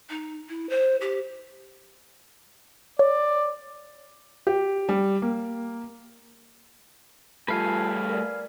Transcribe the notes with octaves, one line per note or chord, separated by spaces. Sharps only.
D#4
E4
C5
G4
C#5 D5
G4
G3
A#3
G3 A3 F4 B4 F5 G#5 A5
A#4 D5